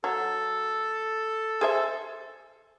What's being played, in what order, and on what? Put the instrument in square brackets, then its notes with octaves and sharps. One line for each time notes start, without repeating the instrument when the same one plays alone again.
[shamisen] F#3 [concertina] A4
[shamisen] G#4 C5 E5